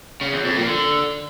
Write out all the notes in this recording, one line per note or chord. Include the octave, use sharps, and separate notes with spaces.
C#3
E2
F2
A#2
D3